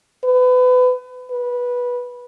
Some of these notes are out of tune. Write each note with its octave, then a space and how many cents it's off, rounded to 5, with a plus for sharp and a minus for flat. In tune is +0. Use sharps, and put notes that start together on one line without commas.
B4 +30
B4 -15